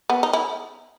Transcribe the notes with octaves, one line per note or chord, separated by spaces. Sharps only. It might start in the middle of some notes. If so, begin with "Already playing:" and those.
B3
D#4
E4